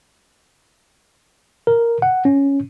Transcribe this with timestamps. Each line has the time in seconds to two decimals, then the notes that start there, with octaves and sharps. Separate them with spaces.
1.67 A#4
2.02 F#5
2.25 C#4